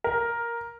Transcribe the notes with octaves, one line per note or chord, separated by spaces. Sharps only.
A#4